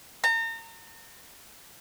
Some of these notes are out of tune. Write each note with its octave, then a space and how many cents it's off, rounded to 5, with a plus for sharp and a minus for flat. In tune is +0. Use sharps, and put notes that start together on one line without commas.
A#5 -35